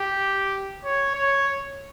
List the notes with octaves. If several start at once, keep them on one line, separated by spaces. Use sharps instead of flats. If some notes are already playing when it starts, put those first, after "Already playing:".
Already playing: G4
C#5
C#5